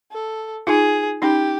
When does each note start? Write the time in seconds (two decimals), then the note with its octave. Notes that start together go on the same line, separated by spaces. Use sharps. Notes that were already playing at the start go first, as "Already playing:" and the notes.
0.12 A4
0.67 D#4 F4 G#4
1.22 C#4 D#4 G4